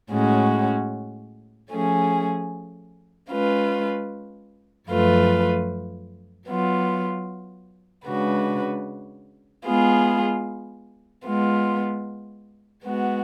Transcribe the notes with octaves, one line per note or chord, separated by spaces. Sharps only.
A2 G#3 C#4 F#4
F3 A3 C#4 G#4
G#3 C#4 F4 B4
F#2 F3 A3 F4 B4
F#3 B3 F4
C#3 G#3 D4 F#4 B4
G#3 B3 F4 G#4
G#3 B3 F4
G#3 B3 F#4